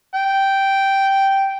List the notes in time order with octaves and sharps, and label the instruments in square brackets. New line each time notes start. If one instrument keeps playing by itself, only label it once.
[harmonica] G5